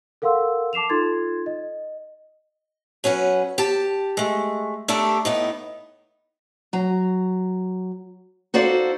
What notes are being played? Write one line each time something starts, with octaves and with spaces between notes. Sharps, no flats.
A4 A#4 F5 F#5 C6 E6
A5 D6 C7 E7 F7
D#4 F4 A4 C6 G#6 A6
D#5
F#3 C#4 B4 F#5
G4 A5
G#3 A3
A3 D4 G4 A4 A#4
A2 B3 D#4
F#3 A#5
D#4 F#4 A4 C5 D5 F5